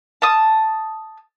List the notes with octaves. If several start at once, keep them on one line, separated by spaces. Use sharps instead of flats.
A5 D#6